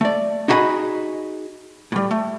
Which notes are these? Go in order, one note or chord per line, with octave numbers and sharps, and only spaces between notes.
A3 D5
D#4 E4 F#4 G#4 D#5 B5
A2 G3
A3